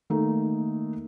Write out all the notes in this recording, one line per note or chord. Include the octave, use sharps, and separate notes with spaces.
D#3 A3 A#3 D#4